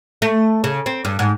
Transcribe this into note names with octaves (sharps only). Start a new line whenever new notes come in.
A3
C#3
C4
G2
G#2